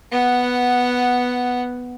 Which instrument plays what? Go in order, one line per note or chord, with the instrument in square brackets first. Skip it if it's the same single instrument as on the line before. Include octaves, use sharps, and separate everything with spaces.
[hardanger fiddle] B3 F#5